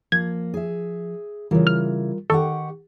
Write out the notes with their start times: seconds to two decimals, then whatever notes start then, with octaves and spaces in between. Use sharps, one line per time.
0.12 F3 A#3 G#6
0.54 G#4 E5
1.51 C#3 E3 G3 F4 A#4
1.67 F6
2.30 D#3 G4 A4 F#5 C#6